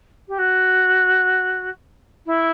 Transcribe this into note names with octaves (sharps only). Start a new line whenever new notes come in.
G4
F#4
E4